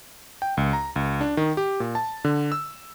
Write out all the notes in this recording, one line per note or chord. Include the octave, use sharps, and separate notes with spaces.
G5
C#2
A#5
C#2
D4
D#3
G4
A#2
A5
D3
E6